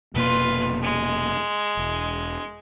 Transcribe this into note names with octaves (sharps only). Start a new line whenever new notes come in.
F1 B2 A#3 F4 B4
G#3
E1